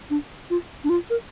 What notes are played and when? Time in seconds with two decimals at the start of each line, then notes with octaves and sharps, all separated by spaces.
0.10 D4
0.50 F4
0.84 D4
0.89 F4
1.10 A#4